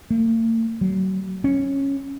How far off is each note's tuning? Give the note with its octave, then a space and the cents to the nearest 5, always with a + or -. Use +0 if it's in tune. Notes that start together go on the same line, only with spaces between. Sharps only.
A#3 -45
F#3 +35
C#4 -10